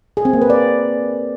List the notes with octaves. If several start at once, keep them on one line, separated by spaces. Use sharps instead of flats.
G#4
C4
A#3
B4
D5